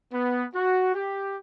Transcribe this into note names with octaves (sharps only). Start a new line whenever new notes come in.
B3
F#4
G4